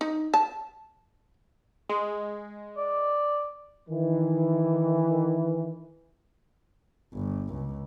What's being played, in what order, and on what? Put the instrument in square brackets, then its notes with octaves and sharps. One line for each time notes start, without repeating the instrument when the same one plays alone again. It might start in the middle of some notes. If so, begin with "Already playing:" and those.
[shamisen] D#4
A5
[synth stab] G#3
[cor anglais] D5
[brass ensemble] D#3 E3
[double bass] G1
C#2